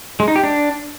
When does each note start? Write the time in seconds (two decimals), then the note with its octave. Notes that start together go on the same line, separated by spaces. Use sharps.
0.20 G#3
0.28 D#4
0.36 G4
0.44 D4